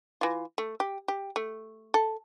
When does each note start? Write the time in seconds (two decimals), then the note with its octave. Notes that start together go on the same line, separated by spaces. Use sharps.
0.21 E3 F4
0.58 A3
0.80 G4
1.08 G4
1.36 A3
1.94 A4